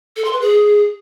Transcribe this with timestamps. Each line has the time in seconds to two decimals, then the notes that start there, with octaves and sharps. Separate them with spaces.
0.16 A4
0.25 C6
0.33 B4
0.41 G#4